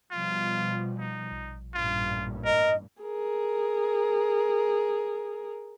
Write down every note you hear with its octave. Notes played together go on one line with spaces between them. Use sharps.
B2 F3 G3 F4
D#4
A#1
A1 G2 A#2 F4
A#4 D#5
G#4 A#4